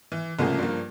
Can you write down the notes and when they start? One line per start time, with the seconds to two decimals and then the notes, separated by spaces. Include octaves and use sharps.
0.12 E3
0.39 C2 C#3 F3 A3 A#3 G#4
0.58 G2 F3 A#3